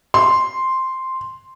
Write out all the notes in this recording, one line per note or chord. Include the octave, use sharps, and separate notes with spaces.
C6